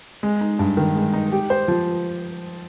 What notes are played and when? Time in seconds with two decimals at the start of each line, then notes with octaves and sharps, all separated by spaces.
0.23 G#3
0.41 D#4
0.59 G2
0.77 D#3
0.95 G#3
1.13 D#4
1.32 G4
1.50 C5
1.68 F3